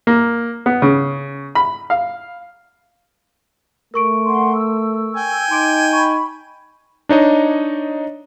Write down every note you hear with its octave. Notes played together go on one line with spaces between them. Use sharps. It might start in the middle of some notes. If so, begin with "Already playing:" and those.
A#3
B3
C#3
B5
F5
A3 A#4 C#6 D7
F#5 C6
E6
G5 G#5
D#4 C6 D6 D7
B5 C#6
D4 D#4 C#5 D#5